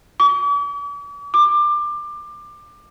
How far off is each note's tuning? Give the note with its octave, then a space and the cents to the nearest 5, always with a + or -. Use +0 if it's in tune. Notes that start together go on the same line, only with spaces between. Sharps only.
D6 -45
D6 +20